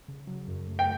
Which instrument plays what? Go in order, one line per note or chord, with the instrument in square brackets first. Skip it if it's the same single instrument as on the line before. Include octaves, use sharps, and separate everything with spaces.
[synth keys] C#3
F#3
F#2
A3
[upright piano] G5